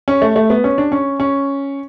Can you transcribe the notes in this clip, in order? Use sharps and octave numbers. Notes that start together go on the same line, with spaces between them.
C#4
A3
A3
B3
C#4
D4
C#4
C#4